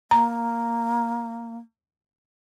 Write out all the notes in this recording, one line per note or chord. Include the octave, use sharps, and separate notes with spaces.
A#3 A#5